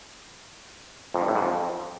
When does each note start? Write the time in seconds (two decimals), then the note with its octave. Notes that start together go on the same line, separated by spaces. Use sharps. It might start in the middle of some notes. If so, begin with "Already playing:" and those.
1.14 F2
1.21 G2
1.28 A2
1.35 G#2
1.42 F2